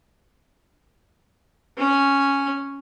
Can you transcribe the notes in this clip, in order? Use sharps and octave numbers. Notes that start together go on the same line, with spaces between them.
C#4 G#5